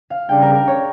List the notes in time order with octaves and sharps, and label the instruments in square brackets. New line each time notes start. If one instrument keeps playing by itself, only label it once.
[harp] F5
[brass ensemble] C#3 G3 D4 [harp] G5
[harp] A#4
A#4
C#5